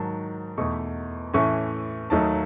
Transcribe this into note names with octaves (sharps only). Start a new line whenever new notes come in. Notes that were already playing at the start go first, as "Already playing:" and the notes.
Already playing: G#2 D#3 F#3 A5
E2 B2 A3 D#4 C#6
A2 E3 A3 C#4 C#6
D#2 D#3 F#3 A3 D#4 A5